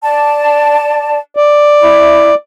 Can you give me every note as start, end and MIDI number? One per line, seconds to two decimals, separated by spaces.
0.02 1.17 74
0.02 1.17 81
1.37 2.35 74
1.81 2.31 64